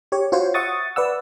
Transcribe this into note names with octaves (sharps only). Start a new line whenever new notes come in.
G4 C#5
F4 F#4 C5 C#5
E5 F#5 C#6 D#6 A6
B4 D5 F#5 E6